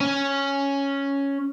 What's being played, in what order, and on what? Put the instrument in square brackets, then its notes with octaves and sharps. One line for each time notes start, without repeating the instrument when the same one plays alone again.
[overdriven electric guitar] C#4